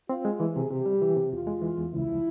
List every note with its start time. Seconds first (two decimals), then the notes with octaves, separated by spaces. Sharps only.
0.09 C4 F4
0.25 G#3
0.40 E3 G#4
0.56 C3
0.70 C3 G4
0.86 G3
1.02 E3
1.16 C3
1.32 E2 F4
1.47 G#3
1.62 E3
1.77 E2
1.93 C#2 E4
2.08 F3